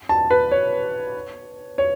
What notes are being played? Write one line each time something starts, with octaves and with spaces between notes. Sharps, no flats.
A5
B4
C#5
C#5